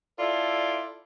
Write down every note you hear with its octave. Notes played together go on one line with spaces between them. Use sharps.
E4 F4 A4 D5